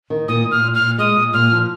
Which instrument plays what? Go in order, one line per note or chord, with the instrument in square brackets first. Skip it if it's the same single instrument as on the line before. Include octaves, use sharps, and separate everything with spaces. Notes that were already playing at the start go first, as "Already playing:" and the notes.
[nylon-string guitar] D#3
[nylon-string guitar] A#2 [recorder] D#6
[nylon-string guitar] A#2
[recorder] F6
[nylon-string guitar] A#2
[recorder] F6
[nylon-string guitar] A#2
[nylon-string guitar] G#3 [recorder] D#6
[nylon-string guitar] A#2
[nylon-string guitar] A#2 [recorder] F6
[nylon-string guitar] F3